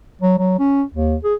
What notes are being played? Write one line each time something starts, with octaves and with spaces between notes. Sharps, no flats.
F#3
F#3
C#4
D#2
G#4